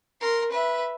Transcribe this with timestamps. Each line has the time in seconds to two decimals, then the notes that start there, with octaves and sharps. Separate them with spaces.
0.21 A#4 C6
0.52 B4 E5